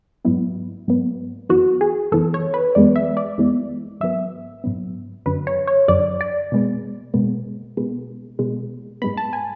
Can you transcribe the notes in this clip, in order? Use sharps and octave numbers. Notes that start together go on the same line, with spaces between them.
G#2 F#3 B3 E4
G#2 F#3 B3
F#2 E3 B3 F#4
G#4
F#2 E3 B3 A4
C#5
B4
F#2 E3 G#3 B3 D5
E5
D5
F#2 E3 G#3 B3
G#2 F#3 B3 E5
G#2 F#3 B3
F#2 D3 F#3 B4
C#5
C#5
F#2 D3 F#3 D5
D5
B2 G#3 B3
B2 G#3 B3
B2 G#3 B3
B2 G#3 B3
G#2 G#3 B3 B5
A5
G#5